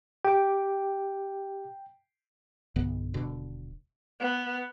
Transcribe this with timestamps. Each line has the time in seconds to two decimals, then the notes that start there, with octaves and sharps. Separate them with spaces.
0.25 G4 G5 D6
2.76 B1 G2 D3 B3
3.14 D#1 B2 D3
4.20 B3